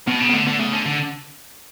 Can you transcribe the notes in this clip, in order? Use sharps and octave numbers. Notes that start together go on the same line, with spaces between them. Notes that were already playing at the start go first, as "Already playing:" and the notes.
B2 B3
C#3
B3
D3 A3
D3 B3
C#3 A3
D3
D3